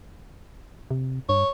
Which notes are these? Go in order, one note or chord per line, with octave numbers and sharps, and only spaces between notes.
C3
G2 C#5